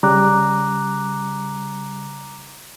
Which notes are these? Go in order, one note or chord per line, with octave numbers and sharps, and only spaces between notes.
C#3 G3 A#5 D6 F#6